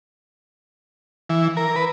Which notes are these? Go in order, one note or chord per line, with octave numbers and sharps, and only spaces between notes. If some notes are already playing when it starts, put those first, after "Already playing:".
E3
A#4
B4